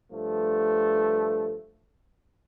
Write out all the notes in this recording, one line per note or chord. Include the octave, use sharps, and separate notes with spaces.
G2 F3 A3